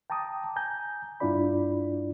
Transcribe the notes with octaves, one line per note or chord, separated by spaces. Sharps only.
G5 A5 A#5 D6 D#6
G#5 A#5 G6
G2 D4 E4 F4 D5 B5